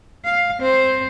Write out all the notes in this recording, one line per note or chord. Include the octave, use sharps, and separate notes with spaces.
F5
C4 C5